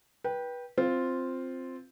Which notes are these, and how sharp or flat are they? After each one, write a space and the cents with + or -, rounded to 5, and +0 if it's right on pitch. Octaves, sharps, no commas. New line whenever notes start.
B4 -25 G5 +0
C4 +0 F4 +0